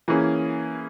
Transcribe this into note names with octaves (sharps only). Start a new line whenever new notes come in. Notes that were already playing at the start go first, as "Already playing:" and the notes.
E3 A#3 C#4 G#4